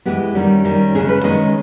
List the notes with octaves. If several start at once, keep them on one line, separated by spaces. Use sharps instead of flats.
E3 G#3 B3 G4
D#3 G3 C#4
D#3 G3 C#4
C#3 G#3 C#4 G#4
B4
D#3 G#3 C#4 D#5